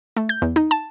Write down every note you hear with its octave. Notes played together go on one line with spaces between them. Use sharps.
A3
G6
E2
D#4
A5